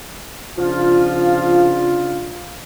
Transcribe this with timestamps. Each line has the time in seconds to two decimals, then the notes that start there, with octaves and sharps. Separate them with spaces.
0.58 C#3 F3 D4 F4